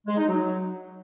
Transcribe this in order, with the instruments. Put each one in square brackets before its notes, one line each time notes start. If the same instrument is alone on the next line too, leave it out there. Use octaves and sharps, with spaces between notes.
[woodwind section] G#3
D#4
F#3